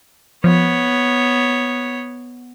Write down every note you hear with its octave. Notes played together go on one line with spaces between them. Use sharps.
F3 B3 C#5